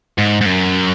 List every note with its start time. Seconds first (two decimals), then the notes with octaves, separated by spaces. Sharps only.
0.18 G#2
0.41 G#2
0.46 F#2